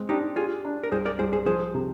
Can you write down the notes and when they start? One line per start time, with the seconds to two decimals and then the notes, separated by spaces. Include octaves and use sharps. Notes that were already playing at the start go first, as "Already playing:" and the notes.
Already playing: G#3 C4
0.09 D4 D#4 G4
0.36 F4 G4 G#4
0.65 D4
0.83 A#4
0.92 C2 G#4 C5
1.05 A#4 D5
1.19 C2 G#4 C5
1.33 G#4 C5
1.46 F3 G#4 C5
1.74 C3